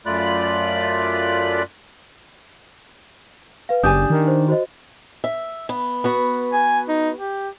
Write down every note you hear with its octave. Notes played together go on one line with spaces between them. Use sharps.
F#2 A3 F4 D5 B5 F#6
B4 F5
F#1 D4 G4 G#5 D#6 G6
D#3
C5
F#4 C5 D#5
E5
B3
B3 F#4 B4
G#5
D#4
G4